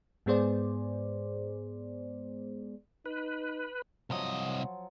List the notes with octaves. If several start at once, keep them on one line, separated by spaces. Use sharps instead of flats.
G#2 G#3 B3 G#4 C5 D5
D#4 B4
C2 F3 F#3 D#5